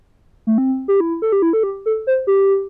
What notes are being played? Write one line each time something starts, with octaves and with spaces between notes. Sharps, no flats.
A3
C4
G4
E4
A4
G4
E4
A4
G4
A4
C5
G4